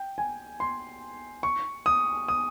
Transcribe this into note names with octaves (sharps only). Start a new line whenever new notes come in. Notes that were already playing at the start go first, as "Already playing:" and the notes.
Already playing: G5
G#5
C6
C#6
D#6
D#6